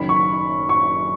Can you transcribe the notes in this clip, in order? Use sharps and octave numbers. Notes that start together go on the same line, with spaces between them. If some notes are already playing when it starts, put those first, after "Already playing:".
Already playing: F#1 F#2 D#3 B5
C#6
C#6